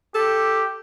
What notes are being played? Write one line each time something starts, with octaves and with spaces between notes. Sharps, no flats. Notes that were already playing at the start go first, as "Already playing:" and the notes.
G4 A4